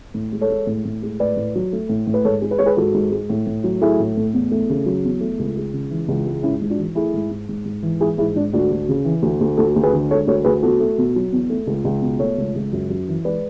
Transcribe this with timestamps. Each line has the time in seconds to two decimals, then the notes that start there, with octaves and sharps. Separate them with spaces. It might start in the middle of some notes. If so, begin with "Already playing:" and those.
0.14 A2
0.32 G#3
0.41 A4 C#5
0.49 G#3
0.67 A2
0.85 A2
1.02 G#3
1.20 A2 B4 D5
1.36 A2
1.55 F#3
1.72 A3
1.89 A2
2.07 A2
2.14 B4
2.25 G#2 A4 C#5
2.42 G#3
2.51 B4
2.58 G#3 C#5
2.66 G#4 B4
2.76 G#2 F#4 A4
2.94 G#2
3.11 G#3
3.30 A2
3.47 A2
3.64 F#3
3.81 A3 E4 G#4
4.00 A2
4.17 A2
4.33 E2
4.51 A3
4.69 C#3
4.86 F#3
5.04 E2
5.21 A3
5.39 C#2
5.57 G#3
5.73 C#3
5.90 E3
6.08 C#2
6.26 G#3
6.43 G#2 C#4 E4
6.61 G#2
6.70 D4 F#4
6.78 E3
6.95 A3 E4 G#4
7.13 G#2
7.31 G#2
7.49 G#2
7.65 G#2
7.83 E3
8.00 G#3 E4 G#4
8.18 G#2 E4 G#4
8.35 G#2 D4
8.53 D2 D4 F#4
8.71 D2
8.88 C#3
9.05 E3
9.22 D2
9.41 D2
9.57 D2 F#4 A4
9.76 D2
9.83 G#4 B4
9.93 D3
10.10 G#3 A4 C#5
10.27 D2 A4 C#5
10.44 D2 G#4 B4
10.63 E2 F#4 A4
10.80 A3
10.98 B2
11.16 F#3
11.32 E2
11.50 A3
11.67 C#2
11.85 C#2
12.02 B2
12.19 A3 A4 C#5
12.37 C#2
12.55 C#2
12.72 F#2
12.89 F#2
13.08 E3
13.25 G#3 B4 D5